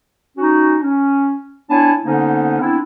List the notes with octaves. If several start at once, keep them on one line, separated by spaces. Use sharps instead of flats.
C#4 D#4 F#4
C#4
B3 D4 E4 C#5 G#5 A5
D3 A#3 B3 C#4 D#4 C5
B3 C4 D4 E4